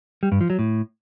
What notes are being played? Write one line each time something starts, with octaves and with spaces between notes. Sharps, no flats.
G3
G2
F3
F#3
A2